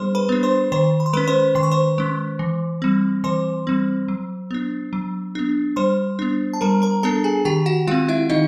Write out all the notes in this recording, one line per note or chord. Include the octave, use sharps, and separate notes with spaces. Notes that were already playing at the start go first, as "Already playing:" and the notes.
Already playing: G3 B3 D4 G#4 C5 C6
B4 B5
B3 D4
C5 C6
D#3 C5 C6
B5
C6
G#3 C#4 B4 B5
C5 C6
D#3 C6
C#6
C5 C6
G#3 C#4
E3
G3 C4
E3 C5 C6
G3 C4
F#3
B3 D4
F#3
B3 D4
G3 C5 C6
B3 D4
A5
G3 A#4 A#5
A#4 A#5
B3 D4 A4 A5
G#4 G#5
D#3 G4 G5
F#4 F#5
G#3 C4 F4 F5
E4 E5
D#3 D#4 D#5